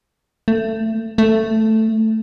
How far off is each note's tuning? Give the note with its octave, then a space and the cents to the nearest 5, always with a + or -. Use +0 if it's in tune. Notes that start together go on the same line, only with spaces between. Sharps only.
A3 +20
A3 +5